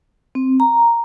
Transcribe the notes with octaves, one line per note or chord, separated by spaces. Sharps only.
C4
A#5